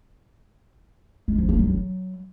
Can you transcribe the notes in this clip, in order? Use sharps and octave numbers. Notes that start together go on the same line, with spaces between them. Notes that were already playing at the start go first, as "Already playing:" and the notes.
G#3
F3
A#3
F#3
F#3